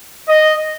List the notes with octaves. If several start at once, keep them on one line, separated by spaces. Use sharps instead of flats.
D#5